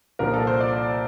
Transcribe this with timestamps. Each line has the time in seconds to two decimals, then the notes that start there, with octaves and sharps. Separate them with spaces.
0.19 C2 A#2 F3 A#4
0.34 A4
0.47 C5
0.60 D5